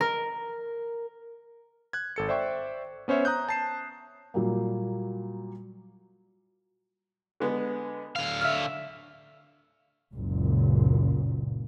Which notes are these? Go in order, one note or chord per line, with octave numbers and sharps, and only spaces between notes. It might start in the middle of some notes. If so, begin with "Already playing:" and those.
A#4
F#6 G#6
G#1 A4 C#7
C5 D5 E5 G5 C#6
B3 C#4 C5 C#5 E5
A#5 D#6 F#6 G6
A5 C7 E7
A#2 F#3 G3 A#3
D3 G#3 B3
D3 F5
E5 E6 F6
F#1 C#2 A#2